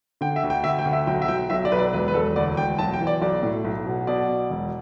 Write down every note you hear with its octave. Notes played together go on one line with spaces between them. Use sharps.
D3 G5
E5
D2
G5
D2 E5
G5
D2
E5
B1 G5
E5
B1 G5
B1 E5
D5
B1 B4
D5
E1 B4
B4
E1 A4
D2 D5
E1 G5
B1 A5
G5
E3
D5
B1 D5
A2
B1
B2
B2 D5
B2
E1